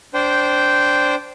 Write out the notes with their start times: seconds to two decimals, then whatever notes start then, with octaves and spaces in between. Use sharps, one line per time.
0.14 D4 C5 G5